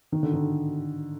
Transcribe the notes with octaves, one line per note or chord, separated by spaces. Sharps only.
D#3
D3
D#3